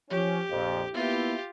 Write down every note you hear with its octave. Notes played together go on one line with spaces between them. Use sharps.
F3 C#4 G4
A#1 F2
A#3 B3 E4 F4 G4